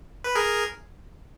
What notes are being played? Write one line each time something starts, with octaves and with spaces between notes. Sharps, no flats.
B4
G#4 A#4